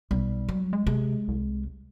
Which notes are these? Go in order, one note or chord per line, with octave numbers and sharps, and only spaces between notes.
B1 G3
F#3
G#3
C3 G#3
C2